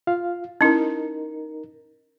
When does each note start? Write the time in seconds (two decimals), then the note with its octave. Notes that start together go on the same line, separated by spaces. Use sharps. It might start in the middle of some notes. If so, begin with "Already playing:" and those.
0.07 F4 F5
0.61 C#4 D#4 E4 A#4